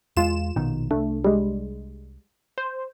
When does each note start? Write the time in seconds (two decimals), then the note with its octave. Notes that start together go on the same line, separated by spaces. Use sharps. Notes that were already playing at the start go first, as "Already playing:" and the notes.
0.17 E2 G#3 F4 E7
0.56 A#1 B2 D#3
0.91 C2 A3 D4
1.24 G3 G#3
2.58 C5